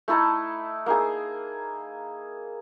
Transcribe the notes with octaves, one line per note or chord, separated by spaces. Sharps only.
A3 D#4 E4 A4
A#3 D#4 G#4